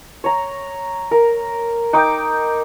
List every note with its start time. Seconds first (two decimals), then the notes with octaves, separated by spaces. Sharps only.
0.24 C#5 A#5
1.11 A#4
1.93 D#4 G5 D6